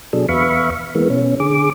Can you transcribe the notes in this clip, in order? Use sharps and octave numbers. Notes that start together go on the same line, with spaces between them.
B2 F#3 D4 G#4 A4
E2 B3 E5 F5 B5 C#6
E3 G#3 A#3 B3
B2 C#4
D3 G#4 D6